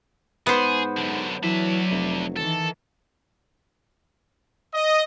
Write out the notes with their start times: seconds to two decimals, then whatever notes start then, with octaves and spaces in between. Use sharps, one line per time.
0.47 G#2 B3 G#4 C5
0.97 F#2 D3
1.43 E3 F#3 D4 E5
1.90 F1
2.37 D#3 E3 A4
4.74 D#5